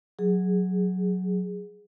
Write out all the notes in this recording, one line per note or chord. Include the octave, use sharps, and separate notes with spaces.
F#3 G#4